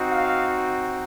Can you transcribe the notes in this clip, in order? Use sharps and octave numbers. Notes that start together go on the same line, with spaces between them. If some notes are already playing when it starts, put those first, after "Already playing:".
Already playing: C4 D#4 F#4
F5